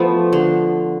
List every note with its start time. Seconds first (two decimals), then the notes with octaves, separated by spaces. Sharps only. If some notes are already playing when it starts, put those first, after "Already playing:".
Already playing: F3 A3 B3
0.33 D3